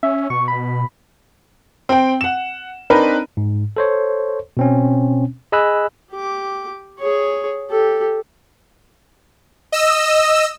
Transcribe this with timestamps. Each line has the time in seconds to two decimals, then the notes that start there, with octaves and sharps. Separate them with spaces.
0.03 C#4 E5
0.30 B2 C#6
0.48 B5
1.89 C4 G5
2.21 F#5 E7
2.90 C4 D4 D#4 A#4 B4
3.37 G#2
3.77 A4 C5 C#5
4.57 B2 C4 C#4
5.52 G#4 D#5 G#5 B5 E6 F#6
6.12 G4 D6
6.99 G#4 C#5
7.70 G4 A4
9.72 D#5 E6